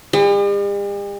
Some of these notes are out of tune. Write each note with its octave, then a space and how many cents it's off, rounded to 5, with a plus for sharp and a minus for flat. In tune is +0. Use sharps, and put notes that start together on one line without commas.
G3 +45